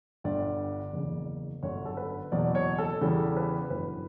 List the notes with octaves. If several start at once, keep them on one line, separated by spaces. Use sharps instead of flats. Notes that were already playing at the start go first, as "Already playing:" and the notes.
G1 G2 D3 D5
F#1 E2 C#3
G1 F#2 D3 C#5
A4
B4
F#1 E2 B2 F#3 D5
C#5
A4
E2 C#3 E3 G3 A4
B4
G1 F#2 E3 B4